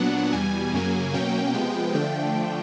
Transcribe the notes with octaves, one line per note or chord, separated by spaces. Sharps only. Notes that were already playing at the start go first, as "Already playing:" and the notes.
Already playing: A#2 F#3 B3 D4 F#5
E2 B2 G3 G#5
F#2 C#3 F#3 A#3 G#5
B2 F#3 A#3 C#4 G5
C3 F3 G#3 B3
D3 F3 A3 D4 G5